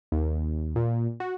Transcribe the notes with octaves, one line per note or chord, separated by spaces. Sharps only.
D#2
A#2
F#4